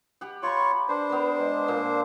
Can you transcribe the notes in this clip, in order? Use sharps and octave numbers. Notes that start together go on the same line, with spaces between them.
G4 F#5
F4 C#5 A#5 B5 C#6
D4 B4 C5
B3 A#4
G#3
A#2 A#3 A5